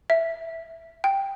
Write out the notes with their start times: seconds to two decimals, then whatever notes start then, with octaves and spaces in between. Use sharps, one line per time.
0.10 E5
1.04 G5